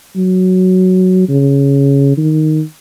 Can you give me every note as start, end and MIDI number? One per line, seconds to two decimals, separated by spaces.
0.16 1.27 54
1.29 2.16 49
2.18 2.62 51